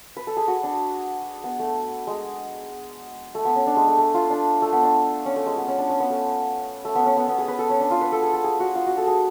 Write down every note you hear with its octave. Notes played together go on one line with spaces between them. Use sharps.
B4
A4
G#4
F#4
D4
B3
A3
G#3
A3
B3
C#4
D4
G#3
A3
A3
F4
D4
A3
B3
D4
C#4
A3
G#3
B3
C#4
D4
C#4
B3
A3
A3
B3
C#4
B3
B3
G#4
B4
A4
C#4
D4
F4
B4
A4
G#4
A4
G#4
F#4
F4
F#4
A4
G#4